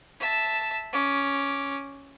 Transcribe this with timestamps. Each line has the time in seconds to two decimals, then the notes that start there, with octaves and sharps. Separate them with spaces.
0.20 E5 A5
0.93 C#4 D6